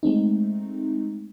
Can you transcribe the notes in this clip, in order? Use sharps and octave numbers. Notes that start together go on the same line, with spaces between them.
G#3 A3 C4 D#4